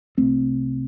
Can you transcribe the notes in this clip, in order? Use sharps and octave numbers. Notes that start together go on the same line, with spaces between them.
C2 C3 A3 C4